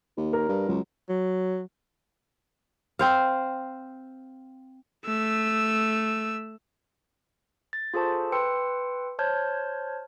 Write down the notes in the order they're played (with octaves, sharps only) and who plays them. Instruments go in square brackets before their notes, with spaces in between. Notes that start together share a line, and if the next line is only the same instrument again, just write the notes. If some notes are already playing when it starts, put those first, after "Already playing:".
[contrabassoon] D#2
[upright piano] A#4
[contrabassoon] G2
[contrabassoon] C#2 [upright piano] F#3
[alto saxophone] F#3
[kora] C4 C5 F5
[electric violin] A3 E6
[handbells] A6
F4 G#4 A4 C5 A5 C#6
B4 G5 C6 E6 C#7
C5 C#5 A5 F6 G6 G#6